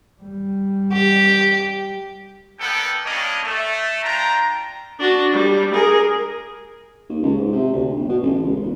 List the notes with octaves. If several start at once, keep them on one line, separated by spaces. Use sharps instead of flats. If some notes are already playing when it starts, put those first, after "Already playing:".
G3
G4
A#3 B3 D4 A4 G5
G3 A#3 C#4 D4 C#5 D#5
A3
D4 F4 G5 A#5
D4 F#4
G3
G#4 A#4
D#2
C#2
G#2
C3
D2
G1
B2
A1
C#2
E1